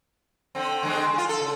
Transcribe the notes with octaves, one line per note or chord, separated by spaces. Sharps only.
D3 C4
D3 G#3 C4
F4 G#4
A4
C#3